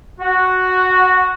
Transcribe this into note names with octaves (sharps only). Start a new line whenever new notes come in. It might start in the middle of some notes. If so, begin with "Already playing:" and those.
F#4